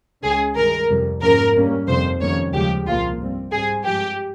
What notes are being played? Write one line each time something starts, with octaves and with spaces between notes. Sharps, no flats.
C#2 C#3 G#3 C#4 G#4
G2 D#3 G#3 A#4
F2 C3 G3
G#2 F3 A#3 C#4 A#4
G2 G3 A#3 C#4
F2 C3 D#3 G3 C5
F2 D#3 G3 A#3 C#4 C#5
D#2 C#3 F3 G#3 G4
C2 A#2 F3 A#3 F4
G2 G3 C4
G#2 G3 C4 G#4
G2 F3 G#3 G4